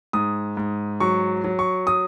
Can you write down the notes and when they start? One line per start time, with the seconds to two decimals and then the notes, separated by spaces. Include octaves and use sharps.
0.13 G#2 D#6
0.57 G#2
1.00 F#3 C#6
1.44 F#3
1.59 C#6
1.87 D#6